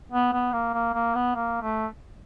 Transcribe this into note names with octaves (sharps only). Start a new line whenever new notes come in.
B3
B3
A#3
A#3
A#3
B3
A#3
A3